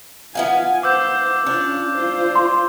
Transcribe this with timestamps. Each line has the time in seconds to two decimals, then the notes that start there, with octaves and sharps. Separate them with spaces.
0.35 B3 E4 F4 F5 G#5
0.83 C5 D6 E6 G6
1.46 C#4 D4 F4
1.95 F4 C5
2.36 C6